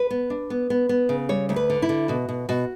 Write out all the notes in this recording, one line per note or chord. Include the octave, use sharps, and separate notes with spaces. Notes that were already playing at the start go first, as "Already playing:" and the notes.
Already playing: B4
B3
D4
B3
B3
B3
C#3
G3 C#5
D2 C#5
B4
D3
E4
D3
B2 F#4
B2
B2 F#4